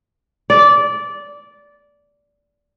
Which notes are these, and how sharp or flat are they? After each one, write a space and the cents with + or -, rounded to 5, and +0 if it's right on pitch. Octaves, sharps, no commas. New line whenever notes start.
D5 -15